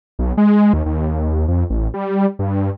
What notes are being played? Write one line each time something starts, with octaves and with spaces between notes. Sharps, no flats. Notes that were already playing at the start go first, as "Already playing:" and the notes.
B1
G#3
D#2
D#2
F2
A1
G3
G2